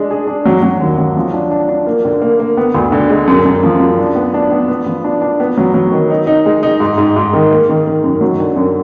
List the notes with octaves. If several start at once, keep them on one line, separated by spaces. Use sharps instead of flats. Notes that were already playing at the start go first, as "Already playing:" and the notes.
Already playing: G#3 D4
G#4
D4
F#3
F#3
D#2
F#3
F3
D4
D4
D4
A#3
D3
A#3
A#3
B3
D2
D3
G#3
F#2
F#2
F3
F#2
D4
B3
D4
B3
B3
F3
D4
D4
B3
F#3
F#3
D#3
D#4
D#4
G#3
D#4
G#2
G#2
G#2
D#3
A#3
D#3
D#3
F#2
F#3
D3
F#2